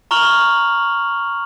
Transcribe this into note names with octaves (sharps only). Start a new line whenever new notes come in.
A#5 C#6 F6 F7 F#7